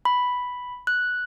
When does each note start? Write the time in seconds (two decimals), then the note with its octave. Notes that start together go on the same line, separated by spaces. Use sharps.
0.05 B5
0.87 F#6